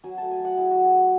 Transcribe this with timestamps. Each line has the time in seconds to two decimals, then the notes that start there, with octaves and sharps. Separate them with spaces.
0.04 F#3 G#5
0.18 A3 A5
0.31 G#5
0.39 F#3
0.45 F#5
0.58 E4 G#4
0.71 F#3 F#4
0.85 G#4
0.93 A3